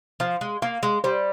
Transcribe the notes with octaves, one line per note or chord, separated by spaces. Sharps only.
F3 F5
G#3
A#3 F5
G#3
G3 C5